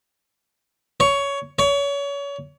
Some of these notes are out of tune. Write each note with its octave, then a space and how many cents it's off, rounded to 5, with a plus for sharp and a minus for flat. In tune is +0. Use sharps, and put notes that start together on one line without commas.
C#5 +15
C#5 +30